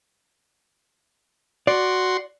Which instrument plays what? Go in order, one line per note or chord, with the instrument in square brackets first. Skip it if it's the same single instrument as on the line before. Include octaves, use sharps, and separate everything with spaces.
[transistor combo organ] F#4 C6 [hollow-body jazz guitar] D5